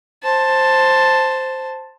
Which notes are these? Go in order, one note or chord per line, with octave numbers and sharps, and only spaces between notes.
C5 A5